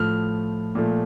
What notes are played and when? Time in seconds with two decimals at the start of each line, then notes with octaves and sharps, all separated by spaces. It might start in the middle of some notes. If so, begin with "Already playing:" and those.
Already playing: A2 F3 A3 F6
0.75 A#2 F3 A3